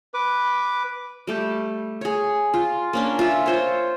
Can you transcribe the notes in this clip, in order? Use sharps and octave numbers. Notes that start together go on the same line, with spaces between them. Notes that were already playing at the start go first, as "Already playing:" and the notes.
B4 D6
G3 A3 G4
G#4 C#5
F4
A#3 C#4 D4
F4 E5
F4 C5 C#5